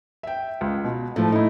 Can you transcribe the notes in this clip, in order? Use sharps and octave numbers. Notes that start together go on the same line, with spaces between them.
E5 G5
C#2
B2
A2 F3 A3
D#4 E4